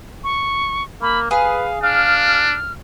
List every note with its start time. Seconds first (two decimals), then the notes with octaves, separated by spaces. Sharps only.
0.24 C#6
1.02 A#3 B5
1.31 G#4 B4 F5
1.84 D4 F5 F6